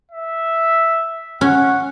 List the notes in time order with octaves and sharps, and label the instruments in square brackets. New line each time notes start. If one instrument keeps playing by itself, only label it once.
[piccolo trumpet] E5
[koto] C#4 [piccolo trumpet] F#5